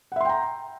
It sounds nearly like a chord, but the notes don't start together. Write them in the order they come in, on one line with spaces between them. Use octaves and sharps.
F#5 E5 C6 G5 A#5